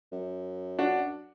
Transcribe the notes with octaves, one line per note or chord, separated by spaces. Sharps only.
F#2
D4 F#4